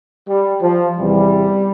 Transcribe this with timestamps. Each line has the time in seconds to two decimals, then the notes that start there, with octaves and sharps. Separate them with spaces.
0.28 G3
0.62 F3
0.97 E2 C3 E3 G3